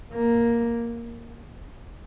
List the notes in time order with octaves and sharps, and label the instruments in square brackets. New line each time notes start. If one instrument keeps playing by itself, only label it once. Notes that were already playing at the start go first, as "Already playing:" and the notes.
[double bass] A#3